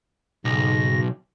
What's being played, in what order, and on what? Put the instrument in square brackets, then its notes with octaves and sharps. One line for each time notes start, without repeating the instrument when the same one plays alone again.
[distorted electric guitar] B1 [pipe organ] G#2 C#3 A#6